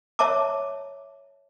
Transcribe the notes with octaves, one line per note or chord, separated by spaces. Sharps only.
C#5 E5 A5 A#5 D6